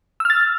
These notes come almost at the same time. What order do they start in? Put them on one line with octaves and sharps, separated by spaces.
E6 F6 A6